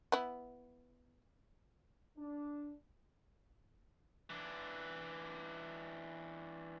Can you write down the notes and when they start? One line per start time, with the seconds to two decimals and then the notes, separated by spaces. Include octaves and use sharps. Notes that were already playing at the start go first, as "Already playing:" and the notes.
0.12 B3 E4
2.18 D4
4.30 E3 D4